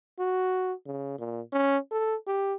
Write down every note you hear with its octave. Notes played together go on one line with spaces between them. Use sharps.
F#4
C#3
A#2
C#4
A4
G4